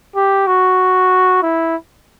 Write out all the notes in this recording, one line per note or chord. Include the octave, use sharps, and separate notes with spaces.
G4
F#4
E4